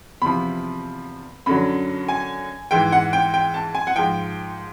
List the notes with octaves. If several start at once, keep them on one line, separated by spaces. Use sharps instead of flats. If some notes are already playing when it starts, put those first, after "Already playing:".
E2 C3 F3 B5
F#2 D3 F#3 B5
G#5
G#2 E3 G5
F#5
G5
G5
A5
G#5
F#5
G#2 F3 G5